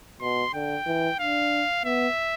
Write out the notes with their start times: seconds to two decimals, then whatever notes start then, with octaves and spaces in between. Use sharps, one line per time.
0.21 B2 C6
0.54 D3 G5
0.86 E3
1.19 D4 F5
1.85 B3 E5